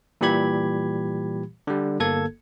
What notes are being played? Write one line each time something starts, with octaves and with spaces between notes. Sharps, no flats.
A#2 E3 G3 G4 B5 G#6
D3 G3
G1 A#3 A4 G#6